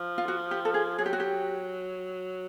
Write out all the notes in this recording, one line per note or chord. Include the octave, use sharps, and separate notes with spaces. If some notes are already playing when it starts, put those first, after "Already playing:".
Already playing: F3
F4
F#4
G4
A4
G#4
F#3 G#4
G4
F#4
G4